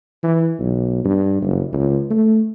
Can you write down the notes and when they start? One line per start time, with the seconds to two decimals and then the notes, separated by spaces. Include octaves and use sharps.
0.23 E3
0.59 B1
1.05 G2
1.42 F#1
1.73 C#2
2.11 A3